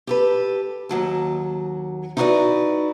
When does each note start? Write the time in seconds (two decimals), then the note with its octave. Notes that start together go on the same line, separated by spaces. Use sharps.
0.07 G4 A4 B4
0.89 D#2 F#3 A5
2.17 D#4 E4 F#4 A4 B4 D5